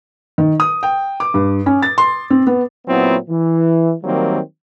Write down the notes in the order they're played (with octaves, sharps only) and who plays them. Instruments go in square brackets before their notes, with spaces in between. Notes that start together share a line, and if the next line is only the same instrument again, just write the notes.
[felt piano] D#3
D#6
G5
D6
G2
C#4
A6
C6
C4
B3
[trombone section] A#2 F#3 B3 C4 E4
E3
D#3 F#3 G3 A#3 C4